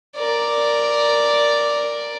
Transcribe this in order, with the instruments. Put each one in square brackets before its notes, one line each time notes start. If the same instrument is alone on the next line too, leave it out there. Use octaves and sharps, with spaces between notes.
[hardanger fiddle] A#4 D5